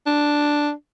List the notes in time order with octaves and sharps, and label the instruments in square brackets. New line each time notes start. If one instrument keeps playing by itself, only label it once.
[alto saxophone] D4